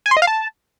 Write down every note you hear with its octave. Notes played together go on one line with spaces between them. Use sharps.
G#5
C6
D#5
F5
A5